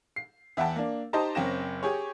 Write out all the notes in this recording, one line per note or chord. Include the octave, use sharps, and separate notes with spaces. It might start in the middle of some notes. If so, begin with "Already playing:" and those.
C7
E2 E5 F#5 G5 A5
A#3 D4
D#4 G4 C5 D#5 A5 A#5
F#1 C4 C#4 G5 A#6 E7
G4 G#4 C#5